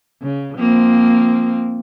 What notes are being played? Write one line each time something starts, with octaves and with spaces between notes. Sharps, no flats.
C#3
F3 A#3 C4